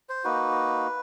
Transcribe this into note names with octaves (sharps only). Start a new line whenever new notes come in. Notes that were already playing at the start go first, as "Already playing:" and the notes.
C5
A#3 D#4 F#4 B4